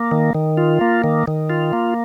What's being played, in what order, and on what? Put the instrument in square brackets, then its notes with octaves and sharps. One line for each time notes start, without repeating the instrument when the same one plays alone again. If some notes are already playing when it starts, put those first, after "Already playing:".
Already playing: [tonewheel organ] A#3
D#3
D#3
F4
A#3
D#3
D#3
F4
A#3